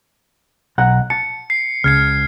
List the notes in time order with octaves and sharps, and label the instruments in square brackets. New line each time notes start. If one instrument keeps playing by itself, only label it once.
[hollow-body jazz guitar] B1 F#5 A#5
[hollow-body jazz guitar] A5 [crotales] C#7
[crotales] C7
[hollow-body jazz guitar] C#2 [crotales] F6 G#6 C7